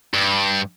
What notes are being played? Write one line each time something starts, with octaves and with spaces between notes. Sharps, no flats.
G2